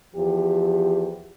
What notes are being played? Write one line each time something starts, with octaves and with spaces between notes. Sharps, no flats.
E2 F3 G4